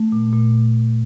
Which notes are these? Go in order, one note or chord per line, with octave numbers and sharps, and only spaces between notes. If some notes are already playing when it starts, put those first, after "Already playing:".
Already playing: A3
A#2
A#2